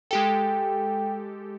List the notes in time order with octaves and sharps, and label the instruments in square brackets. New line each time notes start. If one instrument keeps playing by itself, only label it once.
[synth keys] G#3 G4 A4 [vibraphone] G5